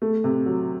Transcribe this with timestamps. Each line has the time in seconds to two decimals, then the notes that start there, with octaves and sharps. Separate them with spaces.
0.02 A3
0.24 C3
0.46 F#3